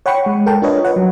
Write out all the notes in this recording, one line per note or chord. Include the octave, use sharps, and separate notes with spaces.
C#5 F#5 G5 B5 C#6 C#7
G#3
A4 A#4 G5 A5
D4 F4 A#4 B4 C#5 D#5
B4 C#5 F#5
F#3